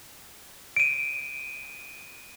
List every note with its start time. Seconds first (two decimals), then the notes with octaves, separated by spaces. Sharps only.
0.77 D7 D#7